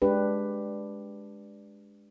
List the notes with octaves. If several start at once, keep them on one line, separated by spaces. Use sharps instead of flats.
G#3 D4 G4 B4